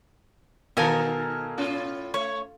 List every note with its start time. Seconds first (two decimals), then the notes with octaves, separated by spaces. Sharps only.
0.77 B2 D#3 D#4 A4 A#4 F5 G#5 A5
1.58 A2 C#4 F4
2.14 A3 C#5